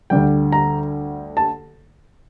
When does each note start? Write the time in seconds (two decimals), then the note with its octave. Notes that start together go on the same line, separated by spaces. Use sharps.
0.10 D2 D3 G3 G5
0.52 A#5
1.37 A5